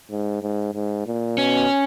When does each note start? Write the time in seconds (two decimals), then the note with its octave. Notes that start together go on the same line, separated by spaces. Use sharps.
0.11 G#2
0.43 G#2
0.74 G#2
1.06 A#2
1.38 B2 C#4